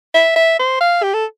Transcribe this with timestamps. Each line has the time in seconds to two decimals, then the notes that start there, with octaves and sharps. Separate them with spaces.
0.14 E5
0.36 E5
0.59 C5
0.81 F5
1.03 G4
1.14 A4